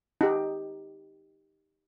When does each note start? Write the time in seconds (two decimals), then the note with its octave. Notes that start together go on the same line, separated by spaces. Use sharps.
0.21 D#4 G4